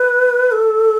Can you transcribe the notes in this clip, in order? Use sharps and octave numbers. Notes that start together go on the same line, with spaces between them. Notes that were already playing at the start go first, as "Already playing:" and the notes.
Already playing: B4
A4